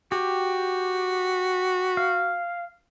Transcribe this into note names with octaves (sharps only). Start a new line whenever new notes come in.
F#4 G4
F5